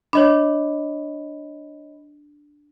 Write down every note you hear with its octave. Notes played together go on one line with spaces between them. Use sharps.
D4 C#5 D#5 B5